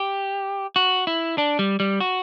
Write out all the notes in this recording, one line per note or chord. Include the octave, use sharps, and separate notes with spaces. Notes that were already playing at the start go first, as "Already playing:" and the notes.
Already playing: G4
F#4
E4
D4
G3
G3
F#4